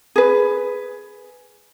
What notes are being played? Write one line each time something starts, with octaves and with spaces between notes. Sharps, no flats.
G#4 B4